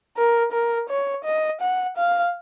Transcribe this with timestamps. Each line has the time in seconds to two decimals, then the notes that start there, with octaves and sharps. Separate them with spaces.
0.17 A#4
0.52 A#4
0.89 C#5
1.25 D#5
1.62 F#5
1.97 F5